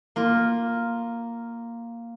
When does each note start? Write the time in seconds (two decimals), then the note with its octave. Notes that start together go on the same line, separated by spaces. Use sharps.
0.16 A#3 F4